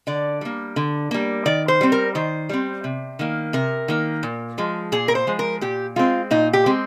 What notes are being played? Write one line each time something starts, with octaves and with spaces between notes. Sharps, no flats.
D3 D5
G3 A#3
D3
G3 A#3
D#3 D5
C5
G3 C4
A#4
D#3 C5
G3 C4
C3
D#3 A#3
C3 A#4
D#3 A#3
A#2
F3 G#3
A#2 G#4
A#4
C5
F3 G#3
A#4
A#2 G4
G#3 C4 F4
A#2 D#4
G4
G#3 C4